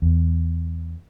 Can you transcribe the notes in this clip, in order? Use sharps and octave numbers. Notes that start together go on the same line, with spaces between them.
E2